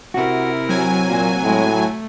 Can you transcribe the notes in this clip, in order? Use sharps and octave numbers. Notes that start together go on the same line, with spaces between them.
C3 E4 F#4 A#4
F#3 C4 G#5
A#2 A#3
A2 G#3
A3